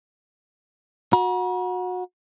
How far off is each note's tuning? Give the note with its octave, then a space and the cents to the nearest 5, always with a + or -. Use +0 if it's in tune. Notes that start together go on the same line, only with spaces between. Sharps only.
F#4 -25 A#5 +45